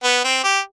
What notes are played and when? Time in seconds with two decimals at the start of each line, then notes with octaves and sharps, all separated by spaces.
0.04 B3
0.24 C4
0.44 G4